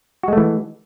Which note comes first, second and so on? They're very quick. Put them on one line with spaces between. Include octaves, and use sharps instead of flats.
F#4 G#3 A3 E3